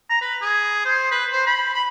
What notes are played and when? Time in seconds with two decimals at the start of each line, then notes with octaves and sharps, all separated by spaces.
0.10 A#5
0.22 B4
0.42 G#4
0.85 C5
1.11 B4
1.33 C5
1.46 B5
1.75 B5